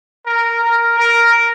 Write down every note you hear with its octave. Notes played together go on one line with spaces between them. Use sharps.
A#4
A#4
A#4